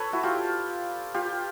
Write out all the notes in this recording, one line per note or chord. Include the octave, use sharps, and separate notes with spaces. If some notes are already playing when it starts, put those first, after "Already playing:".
Already playing: A4 B4 C#5
E4 F#4
F4 G4
F4 G4